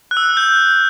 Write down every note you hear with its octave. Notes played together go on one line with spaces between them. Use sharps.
F#6
E6
G6